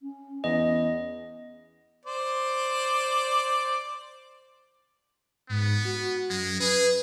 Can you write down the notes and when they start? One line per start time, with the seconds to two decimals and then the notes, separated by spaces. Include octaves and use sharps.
0.02 C#4
0.44 E2 D#5
2.05 C5 D5
5.49 G#2 B3
5.85 F#4
6.30 F#2 G#3
6.60 G#4 B4